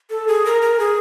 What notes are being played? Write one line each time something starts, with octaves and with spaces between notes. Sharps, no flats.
A4
G#4
A#4
A#4
G#4